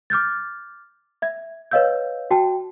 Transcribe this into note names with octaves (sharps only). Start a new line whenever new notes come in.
D6 F6 G6 A6
E5 G#6
B4 C#5 D#5 F5 E6 G6
F#4 G5 A5